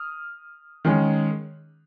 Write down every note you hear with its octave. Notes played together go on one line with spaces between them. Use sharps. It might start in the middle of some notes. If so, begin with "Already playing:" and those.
Already playing: D#6 F6
D#3 G#3 C#4